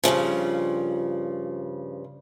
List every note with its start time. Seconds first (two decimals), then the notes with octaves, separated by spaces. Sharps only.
0.04 G2 A#2 C#3 F3